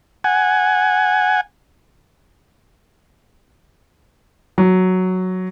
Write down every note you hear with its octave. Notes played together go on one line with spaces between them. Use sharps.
F#5 G#5
F#3